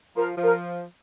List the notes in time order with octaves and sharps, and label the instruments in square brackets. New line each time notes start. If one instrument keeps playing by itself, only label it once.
[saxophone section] F3 [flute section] A#4 A#5
[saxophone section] F3
[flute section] A#4 A#5